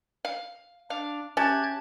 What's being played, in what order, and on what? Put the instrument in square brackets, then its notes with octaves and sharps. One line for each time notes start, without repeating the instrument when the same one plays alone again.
[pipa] F5
[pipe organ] D4 [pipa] F5
[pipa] C#4 [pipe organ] G4 F#6 G#6 [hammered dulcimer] A5